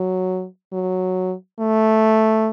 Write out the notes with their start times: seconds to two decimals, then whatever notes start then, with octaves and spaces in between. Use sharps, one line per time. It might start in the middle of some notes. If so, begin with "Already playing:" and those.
Already playing: F#3
0.73 F#3
1.59 A3